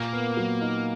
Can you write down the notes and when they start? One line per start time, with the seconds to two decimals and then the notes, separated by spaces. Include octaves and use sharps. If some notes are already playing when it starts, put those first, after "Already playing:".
Already playing: A#2 A#3
0.13 B3
0.37 F#3
0.61 D#4